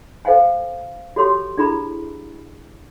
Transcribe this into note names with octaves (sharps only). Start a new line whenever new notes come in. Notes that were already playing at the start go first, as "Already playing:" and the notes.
A4 C5 F5 F#5 G#5
F#4 G4 A4 C#5 C6
D4 E4 G#4 A4 A#5 B5